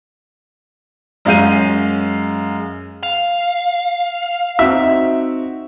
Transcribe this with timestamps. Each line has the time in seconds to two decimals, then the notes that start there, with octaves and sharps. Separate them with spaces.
1.25 F#2 G#3 C#4 F5 G6 D#7
3.03 F5
4.59 C4 D#4 F#4 E5